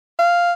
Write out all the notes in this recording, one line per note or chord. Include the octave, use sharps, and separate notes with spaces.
F5